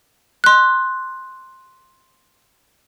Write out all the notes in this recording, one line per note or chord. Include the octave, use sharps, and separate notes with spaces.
C6 F#6